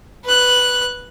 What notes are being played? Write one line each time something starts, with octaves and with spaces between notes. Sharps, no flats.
B4 F#6